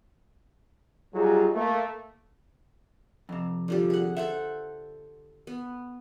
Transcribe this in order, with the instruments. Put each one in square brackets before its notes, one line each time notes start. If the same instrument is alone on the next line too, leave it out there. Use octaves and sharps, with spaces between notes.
[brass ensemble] F#3 G3 D#4 F4 G#4
A3 A#3
[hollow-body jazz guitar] F2 C3
[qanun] D3 F3 G3
G#4 F#5
[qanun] A4 C5 F#5 [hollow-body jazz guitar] E5
[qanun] B3